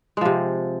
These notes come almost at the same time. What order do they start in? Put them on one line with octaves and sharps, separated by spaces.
G#3 F3 C3